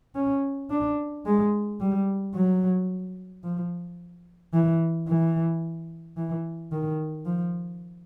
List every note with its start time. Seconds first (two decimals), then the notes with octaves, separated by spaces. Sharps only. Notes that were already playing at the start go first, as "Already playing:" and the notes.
0.15 C#4
0.70 D4
1.26 G#3
1.80 G3
2.34 F#3
3.43 F3
4.53 E3
5.08 E3
6.17 E3
6.72 D#3
7.26 F3